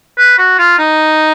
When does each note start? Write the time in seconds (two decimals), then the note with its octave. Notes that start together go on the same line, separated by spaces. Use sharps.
0.18 B4
0.38 F#4
0.58 F4
0.78 D#4